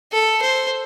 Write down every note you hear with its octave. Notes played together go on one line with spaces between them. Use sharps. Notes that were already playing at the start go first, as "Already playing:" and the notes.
A4
C5